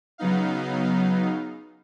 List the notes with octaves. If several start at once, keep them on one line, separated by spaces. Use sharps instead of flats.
C#3 F#3 B3 D#4 F5